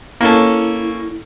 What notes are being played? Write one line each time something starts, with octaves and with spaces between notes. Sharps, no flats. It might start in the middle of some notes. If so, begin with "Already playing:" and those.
A#3 C#4 E4 A4